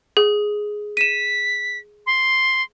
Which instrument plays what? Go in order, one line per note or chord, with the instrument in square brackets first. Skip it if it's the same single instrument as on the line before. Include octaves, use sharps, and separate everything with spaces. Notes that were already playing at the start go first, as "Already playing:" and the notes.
[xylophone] G#4
[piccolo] B6 [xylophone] D#7 E7
[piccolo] C6